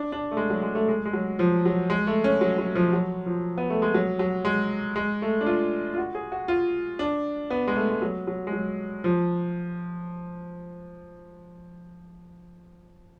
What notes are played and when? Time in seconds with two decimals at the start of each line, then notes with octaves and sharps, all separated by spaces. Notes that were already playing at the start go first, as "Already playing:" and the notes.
Already playing: D4
0.12 D4
0.31 A3
0.37 G#3
0.50 F#3
0.63 G#3
0.75 A3
0.88 G#3
1.05 G#3
1.13 F#3
1.39 F3
1.65 F#3
1.90 G#3
2.07 A3
2.24 C#4
2.41 F#3
2.58 F#3
2.75 F3
2.93 F#3
3.26 F3
3.58 B3
3.70 A3
3.82 G#3
3.94 F#3
4.19 F#3
4.45 G#3
4.96 G#3
5.22 A3
5.41 D4
5.46 F4
5.94 F4
5.98 F#4
6.15 G#4
6.32 F#4
6.48 F4
6.99 D4
7.50 B3
7.67 G#3
7.76 A3
7.90 G#3
8.02 F#3
8.27 F#3
8.47 G#3
8.53 F#3
9.04 F3